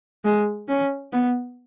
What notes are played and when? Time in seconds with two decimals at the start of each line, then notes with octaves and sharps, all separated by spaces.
0.24 G#3
0.69 C#4
1.13 B3